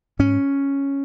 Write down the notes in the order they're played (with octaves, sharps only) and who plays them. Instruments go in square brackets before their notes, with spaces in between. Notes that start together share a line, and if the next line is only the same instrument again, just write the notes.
[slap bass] G#2 C#4